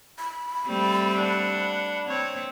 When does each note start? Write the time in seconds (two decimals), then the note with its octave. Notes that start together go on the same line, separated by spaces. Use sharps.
0.19 B5
0.67 G3 A3 C4
1.16 D4 F#5
2.08 C4 C#5